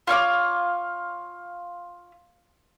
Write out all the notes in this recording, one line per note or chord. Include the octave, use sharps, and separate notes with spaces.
F4 C#5 F5 D6